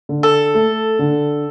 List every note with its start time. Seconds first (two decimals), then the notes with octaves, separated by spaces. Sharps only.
0.09 D3
0.23 A4
0.55 A3
0.99 D3